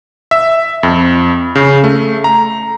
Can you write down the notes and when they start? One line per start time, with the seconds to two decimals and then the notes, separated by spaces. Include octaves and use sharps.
0.31 E5
0.83 F2
1.55 C#3
1.84 A3
2.24 A#5